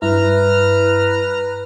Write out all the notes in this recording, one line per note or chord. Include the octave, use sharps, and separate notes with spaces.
G2 E4 B4 A#5 F6